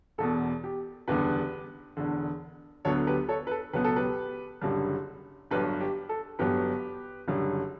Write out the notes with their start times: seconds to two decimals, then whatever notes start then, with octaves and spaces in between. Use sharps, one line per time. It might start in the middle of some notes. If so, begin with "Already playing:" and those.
0.18 E1 E2 B2 A4
0.64 G4
1.08 F#1 E2 D3 G3 B3 G4 B4
1.97 E1 E2 D3
2.85 D2 D3 F#3 B3 A4 C#5
3.07 G4 B4
3.29 A4 C#5
3.47 B4
3.51 A4
3.73 C#2 B2 F#3 B3 B4
3.84 A4
3.96 G4 B4
4.61 F#1 F#2 D3 G3
5.51 G1 G2 F#3 G4 B4
5.80 G4
6.09 A4
6.39 G1 G2 F#3 B3 G4 B4
7.28 F#1 F#2 D3 G3